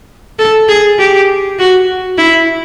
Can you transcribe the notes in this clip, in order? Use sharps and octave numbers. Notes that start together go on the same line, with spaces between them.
A4
G#4
G4
F#4
E4